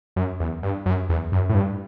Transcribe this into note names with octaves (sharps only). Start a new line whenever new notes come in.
F#2
E2
G2
F#2
E2
F#2
A2
G2